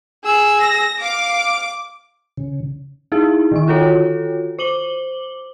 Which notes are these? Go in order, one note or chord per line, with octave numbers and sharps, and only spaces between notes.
G#4 E6
A#6
F5 D6
C#3
D#4 E4 G#4
D3 D#3 C#6
F4 F#4 A4 C#5
C5 D6 F#7 G7